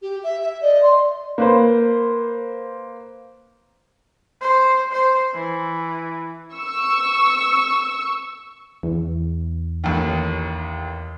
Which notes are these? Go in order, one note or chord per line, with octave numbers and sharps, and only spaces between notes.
G4
E5
E5
D5 D#5
C6
A#3 B4 C5
C5
C5
E3
C#6 E6
E2
A1 D#2